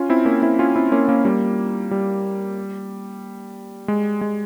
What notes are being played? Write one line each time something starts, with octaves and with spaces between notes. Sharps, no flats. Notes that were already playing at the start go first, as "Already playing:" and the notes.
Already playing: C#4 F4
C4 E4
A#3 C#4
C4 E4
C#4 F4
C4 E4
A#3 C#4
A#3 C#4
G3 A#3
G3
G#3
G#3